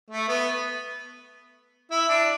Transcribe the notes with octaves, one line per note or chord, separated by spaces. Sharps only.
A3
B3
E4
D4